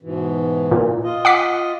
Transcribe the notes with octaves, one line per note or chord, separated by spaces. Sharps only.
G#2 B2 E3
A#2
F4 D#5
F#5 D6 B6